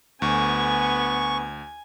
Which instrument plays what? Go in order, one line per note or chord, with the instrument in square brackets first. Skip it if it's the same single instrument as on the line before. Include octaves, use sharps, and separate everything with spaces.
[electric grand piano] D2 [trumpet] B3 [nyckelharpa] G#5 [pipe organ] C#6